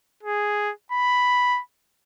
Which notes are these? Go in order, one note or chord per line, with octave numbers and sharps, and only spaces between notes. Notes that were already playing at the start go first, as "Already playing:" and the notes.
G#4
B5